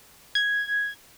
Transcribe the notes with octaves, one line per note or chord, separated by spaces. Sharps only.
G#6